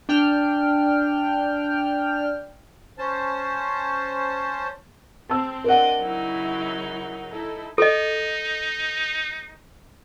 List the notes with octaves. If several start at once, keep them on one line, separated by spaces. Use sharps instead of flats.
D4 G5 F6
C#4 C5 A5
C4 A5 E6
D4 A#4 D5 D#5 F#5
C#3 F#3 D#4 E4
D#4 E4 A4
D#4 A4 D#5